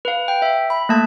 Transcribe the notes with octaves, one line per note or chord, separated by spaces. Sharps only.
B4 F5
G5
E5
B5
A3 A#3 A5 G#6